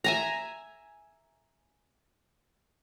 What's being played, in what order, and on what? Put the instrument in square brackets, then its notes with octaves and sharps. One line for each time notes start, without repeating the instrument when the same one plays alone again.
[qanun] E5 G#5 A#5